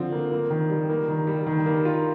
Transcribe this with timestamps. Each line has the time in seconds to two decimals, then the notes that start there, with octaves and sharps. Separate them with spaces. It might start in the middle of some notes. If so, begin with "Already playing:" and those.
Already playing: D3 F3 C4
0.12 A#3
0.32 A#3
0.50 D#3
0.70 G3
0.89 A#3
1.08 D#3
1.27 G3
1.46 D#3
1.66 A#3
1.85 F4